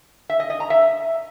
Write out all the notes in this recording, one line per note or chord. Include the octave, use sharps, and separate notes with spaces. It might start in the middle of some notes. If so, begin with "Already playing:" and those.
E5
D#5
D#5
A#5
E5